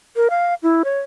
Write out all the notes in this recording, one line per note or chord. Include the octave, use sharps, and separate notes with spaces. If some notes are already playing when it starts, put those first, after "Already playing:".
A#4
F5
E4
C#5